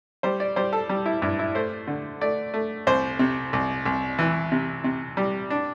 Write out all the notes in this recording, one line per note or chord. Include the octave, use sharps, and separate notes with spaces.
G3 C5
D5
G3 C5
A4
G3
E4
G2 E4
E4
A3 C5
D3
A3 D5
A3
C2 C5
C3
C2
C2
E3
C3
C3
G3
D4